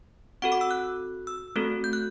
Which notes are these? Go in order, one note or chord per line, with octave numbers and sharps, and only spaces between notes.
C4 F#4 A4 F#5
D6
E6
F#6
E6
A3 C4 F#4 A4
G6
F#6